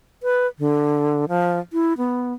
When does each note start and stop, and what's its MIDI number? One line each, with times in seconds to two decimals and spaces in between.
0.23 0.47 71
0.59 1.25 50
1.28 1.59 53
1.73 1.94 64
1.98 2.33 59